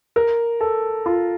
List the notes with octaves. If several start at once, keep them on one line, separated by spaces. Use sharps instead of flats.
A#4
A4
F4